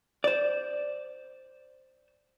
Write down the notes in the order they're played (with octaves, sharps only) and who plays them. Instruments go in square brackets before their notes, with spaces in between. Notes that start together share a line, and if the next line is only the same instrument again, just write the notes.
[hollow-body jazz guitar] C5 D5